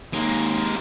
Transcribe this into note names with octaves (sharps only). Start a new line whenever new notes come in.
D#2 G#3 A#3